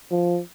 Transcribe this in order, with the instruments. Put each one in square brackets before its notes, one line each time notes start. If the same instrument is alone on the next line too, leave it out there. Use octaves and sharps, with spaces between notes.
[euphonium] F3